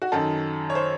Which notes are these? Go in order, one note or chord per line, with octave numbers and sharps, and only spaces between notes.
F#4
F#2 D#3 A4
C#5
C5